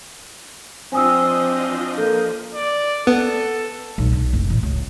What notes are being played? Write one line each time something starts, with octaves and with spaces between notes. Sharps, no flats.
F3 C4 D4 D#5 G#5 D#6 E6
A#3 A4 G6
D5
B3 A4
B1
B1
F#1
A1
C#2